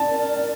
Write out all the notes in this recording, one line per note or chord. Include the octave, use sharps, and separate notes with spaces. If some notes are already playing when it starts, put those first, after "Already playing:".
Already playing: D5 A5
A#4